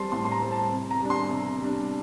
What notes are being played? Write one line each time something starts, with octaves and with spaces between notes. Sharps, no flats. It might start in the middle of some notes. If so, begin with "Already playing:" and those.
Already playing: G3 C4 A5 C6
A2 C6
C6
A#5
G3 C4
A5
C3
A#5
G3 D4
C6
C3
G3 D4